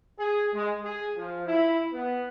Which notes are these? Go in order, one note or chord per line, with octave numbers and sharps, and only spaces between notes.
G#4
G#3
G#4
F3
E4
B3